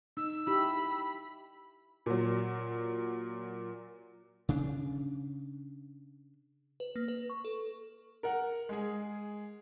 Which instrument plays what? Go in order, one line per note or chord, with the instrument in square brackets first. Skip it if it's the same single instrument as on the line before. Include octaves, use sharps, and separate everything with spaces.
[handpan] D#4 [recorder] E6
[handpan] E4 G4 [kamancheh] B5
[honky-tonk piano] A#2 F#3
[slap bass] C#3 D4
[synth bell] B4
A#3
B4
C#6
A4
[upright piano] A#4 F#5
G#3 G#4